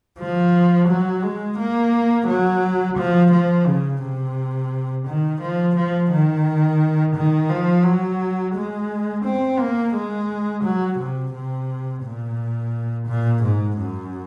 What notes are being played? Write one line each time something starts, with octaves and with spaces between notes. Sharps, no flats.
F3
F#3
G#3
A#3
F#3
F3
F3
C#3
C3
D#3
F3
F3
D#3
D#3
F3
F#3
G#3
C4
A#3
G#3
F#3
C3
C3
A#2
A#2
G#2
F#2